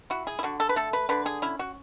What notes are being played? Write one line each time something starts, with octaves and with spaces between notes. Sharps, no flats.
E4 F#4
G#4
E4
D3 F#4
A4
B4
A3 A4
B4
D3 B4
G#4
C#4 E4
F#4